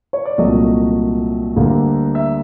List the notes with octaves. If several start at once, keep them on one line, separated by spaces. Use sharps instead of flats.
C#5
D5
C2 A#2 F#3 A3 D#5
D2 D3 G3 A#3
E5